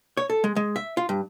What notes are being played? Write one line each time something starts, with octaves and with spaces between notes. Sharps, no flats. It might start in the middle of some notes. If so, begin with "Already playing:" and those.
C#5
A4
G#3
G#3
E5
F4
G2